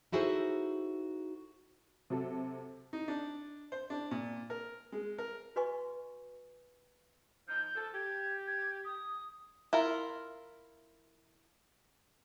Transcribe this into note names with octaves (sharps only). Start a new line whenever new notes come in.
D#4 E4 F#4 G#4 A4 C5
C3 F#3 A4
D#4
D4
C5
D4
A#2
A#4
G#3
A#4
F#4 B4 D#5 G#5 C#6
F3 D#4 G6
F3 A4
G4 G#6
G#6
D#6
E4 F4 A#4